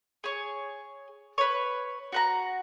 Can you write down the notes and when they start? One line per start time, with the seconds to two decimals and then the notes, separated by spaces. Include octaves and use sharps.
0.24 G#4 C#5
1.38 B4 C#5
2.12 F#4 F#5 A#5